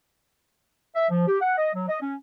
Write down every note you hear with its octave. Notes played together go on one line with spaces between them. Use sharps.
E5
F3
G4
F#5
D#5
F#3
D#5
C#4